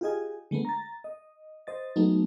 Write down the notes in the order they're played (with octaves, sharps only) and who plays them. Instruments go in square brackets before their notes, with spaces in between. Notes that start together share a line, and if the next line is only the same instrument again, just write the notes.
[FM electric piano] F4 G4 G#4 D#5 G#5
D3 G#3 A3 B3
A#5 A6
D#5
C5 D#5 A6
F#3 G#3 A3 B3 D#4